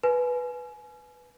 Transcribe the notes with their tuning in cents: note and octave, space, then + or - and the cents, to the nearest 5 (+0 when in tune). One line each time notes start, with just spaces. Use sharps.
B4 +0 G#5 +30